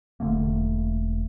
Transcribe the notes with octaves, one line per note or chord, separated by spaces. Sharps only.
E1 D3 A3 A#3